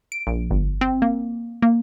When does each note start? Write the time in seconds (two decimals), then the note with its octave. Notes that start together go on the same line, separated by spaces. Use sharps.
0.12 D7
0.27 A#1
0.51 G1
0.81 C4
1.02 A#3
1.62 A#3